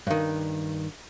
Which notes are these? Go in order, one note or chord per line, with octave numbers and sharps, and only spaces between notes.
G2 D#3